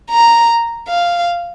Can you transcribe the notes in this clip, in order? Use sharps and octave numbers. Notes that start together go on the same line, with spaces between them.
A#5
F5